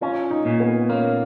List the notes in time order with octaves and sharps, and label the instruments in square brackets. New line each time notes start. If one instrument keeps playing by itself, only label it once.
[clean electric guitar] C#4 [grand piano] F4
[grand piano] D#4
[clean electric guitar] A#2
[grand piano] B3
[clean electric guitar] A#3 [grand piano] C#4